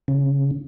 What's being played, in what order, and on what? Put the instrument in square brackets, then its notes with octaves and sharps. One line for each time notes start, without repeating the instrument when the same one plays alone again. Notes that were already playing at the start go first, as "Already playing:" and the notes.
[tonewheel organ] C#3